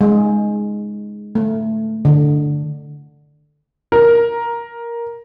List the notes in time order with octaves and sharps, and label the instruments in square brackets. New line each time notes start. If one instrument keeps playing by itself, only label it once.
[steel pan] G#3
A3
D3
[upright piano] A#4